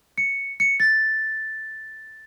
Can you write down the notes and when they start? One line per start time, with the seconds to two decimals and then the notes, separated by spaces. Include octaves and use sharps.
0.18 C#7
0.60 C#7
0.80 A6